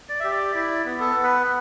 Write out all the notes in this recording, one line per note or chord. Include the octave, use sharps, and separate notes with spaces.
D5
G4 E5
D5
E4 D5
B3
A4
B3
B4